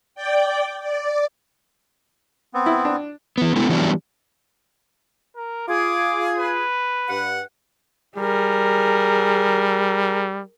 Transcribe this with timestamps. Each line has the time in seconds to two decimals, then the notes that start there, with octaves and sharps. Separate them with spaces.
0.15 D5 G5
0.83 D5
2.54 B3 C4
2.66 E4
2.85 D4
3.38 E3 B3
3.56 G#3 A3 B3 E4
3.69 E3 F#3 G3 B3 D4
5.36 A#4
5.68 F4 G#4 D6
6.38 B4
7.09 G2 F#5
8.18 G3 G#4 A#4